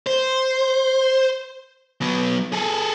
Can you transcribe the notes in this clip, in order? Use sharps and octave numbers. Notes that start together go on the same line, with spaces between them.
C5
F#3 B3
G#4 A4